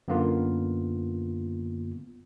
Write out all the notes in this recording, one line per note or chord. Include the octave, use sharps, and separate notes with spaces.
F#2 D3 A#3 B3 F4